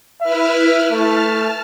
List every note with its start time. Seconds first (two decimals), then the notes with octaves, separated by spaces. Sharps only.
0.21 E4 B4 E5 F6
0.91 A3 A5 F6